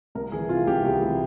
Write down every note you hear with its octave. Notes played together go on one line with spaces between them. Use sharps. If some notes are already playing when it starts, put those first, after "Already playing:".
C2 A#4
E3 G#4
C3 F4
C2 G4
C2 G4
E3 E4